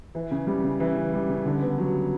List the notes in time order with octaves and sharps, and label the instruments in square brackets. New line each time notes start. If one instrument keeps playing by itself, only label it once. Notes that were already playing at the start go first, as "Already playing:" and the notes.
[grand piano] E3
C#3
G3
C#3
E3
C#3
G3
C#3
D3
B3
F#3